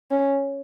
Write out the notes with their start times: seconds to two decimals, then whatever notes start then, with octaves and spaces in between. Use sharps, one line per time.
0.11 C#4